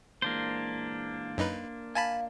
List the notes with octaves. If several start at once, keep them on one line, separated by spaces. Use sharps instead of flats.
A#2 E3 G#3 A#3 D4 C5
F#2 D#4 B4
D#5 F5 G#5 A5 B5